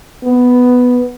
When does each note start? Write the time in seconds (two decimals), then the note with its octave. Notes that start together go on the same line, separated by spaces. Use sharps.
0.24 B3